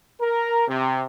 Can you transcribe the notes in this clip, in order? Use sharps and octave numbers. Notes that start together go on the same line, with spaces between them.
A#4
C3